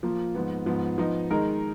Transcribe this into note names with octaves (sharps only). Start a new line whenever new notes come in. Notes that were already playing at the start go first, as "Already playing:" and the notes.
F3 A#3 F4
G#2 F3 B3
G#2 F3 B3
F3 B3 D#4
D#3 G#3 D#4 A#4